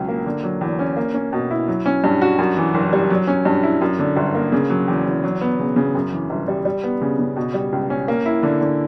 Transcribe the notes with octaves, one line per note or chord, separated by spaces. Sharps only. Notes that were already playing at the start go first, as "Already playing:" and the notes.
Already playing: C#2 B2 F#3 C#4
A#3
D3
F#3
E2
C#4
A#3
C#4
B2
E4
F#3
C#4
G2
F#4
F#2
E3
F#1
G3
F#3
C#4
G2
E4
F#2
D3
G1
A#3
C#3
F#3
E2
E2
F#3
B3
C#3
C#3
F#2
E3
G1
G3
G3
B3
C#3
C#3
B2
G3
C#2
C#4
A#3
E4
D3
D3